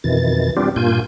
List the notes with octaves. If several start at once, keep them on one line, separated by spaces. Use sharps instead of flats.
F2 B2 D#3 E3 A6
G3 B3 C4 D4 F4 G4
G2 A#2 A#3 F4 G#5 G6